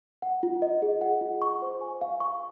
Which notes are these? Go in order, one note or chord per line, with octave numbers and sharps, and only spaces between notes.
F#5
F4
D#5
G#4
F#5
F4
C#6
C5
G#5
F5
C#6